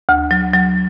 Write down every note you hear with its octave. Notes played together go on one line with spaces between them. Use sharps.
D2
F#3
F#3